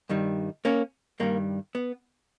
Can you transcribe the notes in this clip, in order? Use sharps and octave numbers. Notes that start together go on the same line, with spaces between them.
G2 D#3 G3
A#3 C#4
G2 D#3 G3 A#3
B3